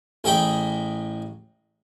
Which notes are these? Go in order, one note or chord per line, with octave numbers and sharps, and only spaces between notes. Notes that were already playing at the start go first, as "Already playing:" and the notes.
A1 G#4 D#5 G5 B5